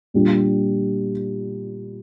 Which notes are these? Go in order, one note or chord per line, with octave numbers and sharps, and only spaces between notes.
A#2 G3 D4 G4